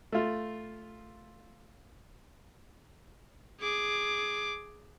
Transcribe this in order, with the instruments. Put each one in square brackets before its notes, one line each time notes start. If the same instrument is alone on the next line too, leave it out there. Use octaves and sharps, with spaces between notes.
[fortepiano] A3 F4
[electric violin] G#4 D6